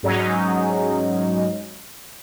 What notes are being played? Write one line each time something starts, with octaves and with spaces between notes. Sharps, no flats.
G#2 F#3 C#4 D#4